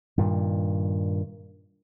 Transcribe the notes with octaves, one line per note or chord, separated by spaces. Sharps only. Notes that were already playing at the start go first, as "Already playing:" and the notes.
G2 A#2 D#3